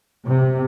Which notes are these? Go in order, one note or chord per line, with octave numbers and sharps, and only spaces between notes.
C3